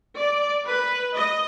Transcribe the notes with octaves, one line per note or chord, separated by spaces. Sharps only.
D5
B4
D#5